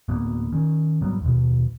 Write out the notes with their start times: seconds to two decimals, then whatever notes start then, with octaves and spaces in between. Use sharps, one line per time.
0.08 D2 A2 A#3 B3
0.52 D#3 C#4
1.01 G#2 F#3 G3 B3
1.21 D#2 B2